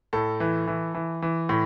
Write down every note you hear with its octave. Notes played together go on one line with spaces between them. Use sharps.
A2 A4
E3
E3
E3
E3
A2